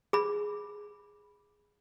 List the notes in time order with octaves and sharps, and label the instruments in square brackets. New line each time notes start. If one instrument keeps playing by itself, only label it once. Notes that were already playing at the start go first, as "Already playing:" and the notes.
[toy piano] G#4 B5